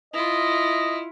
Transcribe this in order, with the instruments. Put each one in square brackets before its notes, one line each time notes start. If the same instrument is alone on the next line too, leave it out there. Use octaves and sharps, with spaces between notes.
[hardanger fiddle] E4 F4 [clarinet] D#5